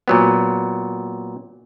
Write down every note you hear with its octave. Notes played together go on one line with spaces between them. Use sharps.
A#2 F#3 B3